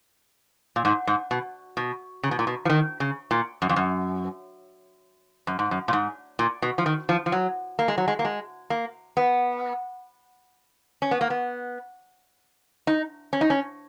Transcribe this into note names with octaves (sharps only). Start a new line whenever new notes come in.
A#2
G#2
G#2
B2
B2
C#3
B2
A#2
B2
F3
D#3
C#3
A#2
F#2
F2
F#2
F#2
G#2
F#2
A#2
G#2
A#2
B2
F3
D#3
F3
F3
F#3
A#3
G#3
F#3
G#3
A#3
G#3
A#3
B3
C#4
B3
A#3
B3
D#4
C#4
D#4
C#4